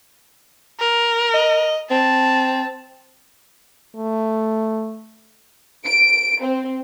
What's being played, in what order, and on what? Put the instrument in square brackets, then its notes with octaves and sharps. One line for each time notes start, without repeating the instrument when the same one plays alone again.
[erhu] A#4
[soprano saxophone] D#5
[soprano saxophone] C4 [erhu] A5
[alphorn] A3
[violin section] D7
C4